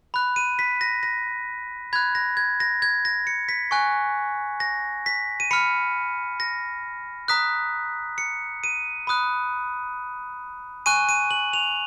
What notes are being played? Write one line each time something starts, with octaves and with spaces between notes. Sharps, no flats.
B5 F#6
D#7
B6
A#6
A#6
B5 F#6 G#6
A#6
G#6
A#6
G#6
A#6
C#7
B6
G#5 C#6 F#6
A#6
B6
D#7
B5 F6 C#7
A#6
A#5 D#6 F#6 B6
C#7
D#7
B5 D#6 F#6
G#5 C#6 F#6 D#7
D#7
F#7
F7